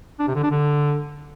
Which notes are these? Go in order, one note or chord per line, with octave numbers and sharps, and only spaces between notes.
D4
C3
D3
D4
D3